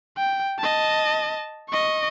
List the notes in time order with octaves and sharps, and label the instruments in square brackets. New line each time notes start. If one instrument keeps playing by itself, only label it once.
[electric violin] G5
D#5 A5
D#5 C#6